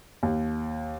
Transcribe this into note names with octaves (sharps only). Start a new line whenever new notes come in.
D#2